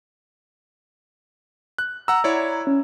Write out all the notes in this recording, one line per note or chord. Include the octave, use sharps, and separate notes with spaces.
F#6
F#5 A#5 E6
E4 C#5 D5
C#4